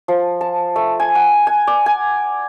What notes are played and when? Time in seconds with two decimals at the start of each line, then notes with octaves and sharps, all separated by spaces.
0.08 F3
0.41 A5
0.76 A3
1.00 G#5
1.15 F#5
1.47 G#5
1.67 D5
1.86 G#5